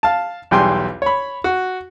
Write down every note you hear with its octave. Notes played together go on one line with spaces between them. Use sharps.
F5 A5
B1 E2 G3 G5 G#5 C6
C#5 B5
F#4